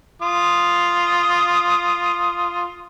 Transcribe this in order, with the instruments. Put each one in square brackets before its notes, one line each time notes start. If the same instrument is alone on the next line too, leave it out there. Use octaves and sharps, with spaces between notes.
[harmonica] F4 D#6